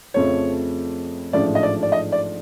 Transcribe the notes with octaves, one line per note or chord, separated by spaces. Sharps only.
F2 C#3 F3 A3 C4 C#5
A1 G#2 F3 A3 D4 D5
D#5
D5
D5
D#5
D5